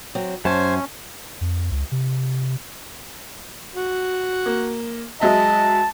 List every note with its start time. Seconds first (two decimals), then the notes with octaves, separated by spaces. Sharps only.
0.15 F#3 C4
0.45 F#2 C#4 C5 G#5 A5
1.41 F2
1.71 C#2
1.92 C3
3.76 F#4
4.46 A#3
5.21 F#3 G#3 D#5 E5 A5